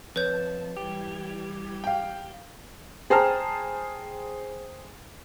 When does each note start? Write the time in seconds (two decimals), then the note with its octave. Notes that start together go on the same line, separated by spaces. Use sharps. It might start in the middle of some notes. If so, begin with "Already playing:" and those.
0.16 F2 B4 C#5 A5 G6
0.77 E3 G3 G4 G#6
1.84 F5 G5
3.10 G#4 C5 G5 A5 A#5 F6